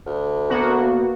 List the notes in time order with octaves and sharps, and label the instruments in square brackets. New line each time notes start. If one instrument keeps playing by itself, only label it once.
[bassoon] D2
[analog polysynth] A#3 B3 F#4